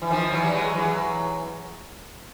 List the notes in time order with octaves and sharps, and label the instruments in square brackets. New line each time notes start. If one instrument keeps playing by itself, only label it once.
[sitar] E3
D#3 F3
E3 F#3
G3
F#3 G#3
E3 F#3